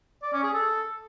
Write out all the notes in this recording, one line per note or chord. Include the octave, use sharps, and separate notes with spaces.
D5
C#4
G#4
A4